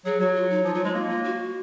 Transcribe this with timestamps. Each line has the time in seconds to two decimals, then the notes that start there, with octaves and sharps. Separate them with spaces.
0.05 F#3 G#4
0.20 F#3 F#4
0.35 F4
0.50 D#4
0.64 F3 F4
0.75 F#3 F4
0.85 G#3 D#4
0.94 A#3 F4
1.09 F4
1.24 F#4